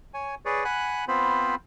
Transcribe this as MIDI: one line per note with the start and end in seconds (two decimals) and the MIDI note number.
0.14 0.35 73
0.14 0.35 80
0.45 0.64 68
0.45 0.64 71
0.45 0.64 73
0.45 0.64 74
0.65 1.05 78
0.65 1.05 80
0.65 1.05 83
0.65 1.05 90
1.08 1.55 59
1.08 1.55 60
1.08 1.55 65
1.08 1.55 72
1.08 1.55 83